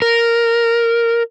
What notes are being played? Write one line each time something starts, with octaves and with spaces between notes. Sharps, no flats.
A#4